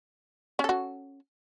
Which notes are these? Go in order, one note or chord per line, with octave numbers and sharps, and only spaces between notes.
C#4 F#4 A4